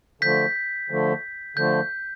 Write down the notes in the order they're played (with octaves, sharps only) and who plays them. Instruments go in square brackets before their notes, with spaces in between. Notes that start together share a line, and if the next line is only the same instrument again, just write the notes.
[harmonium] D3 F3 A3 [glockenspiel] G6 B6
[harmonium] D3 F3 A3
[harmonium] D3 F3 A3 [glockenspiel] G6